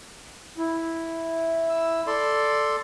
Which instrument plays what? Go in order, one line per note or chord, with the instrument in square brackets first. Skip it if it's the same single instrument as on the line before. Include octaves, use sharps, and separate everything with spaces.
[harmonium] E4
[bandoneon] E6
A4 D5 C6